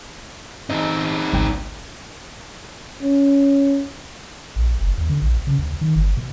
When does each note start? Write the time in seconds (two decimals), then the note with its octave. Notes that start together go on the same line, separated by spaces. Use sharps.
0.70 C4 D#4 D#5
1.32 G#1 C#2 G5
3.01 C#4
4.56 A#1
4.81 F#1
4.98 D#2
5.10 D3
5.22 A#1
5.47 C#3
5.59 D2
5.81 D#3
5.96 G1
6.17 B2